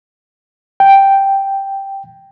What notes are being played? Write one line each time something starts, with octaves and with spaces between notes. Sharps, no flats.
G5